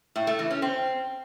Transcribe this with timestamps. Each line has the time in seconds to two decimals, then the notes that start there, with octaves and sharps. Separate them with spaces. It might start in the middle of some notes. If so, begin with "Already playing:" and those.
0.16 A2
0.27 A3
0.39 E3
0.50 C#4
0.62 C4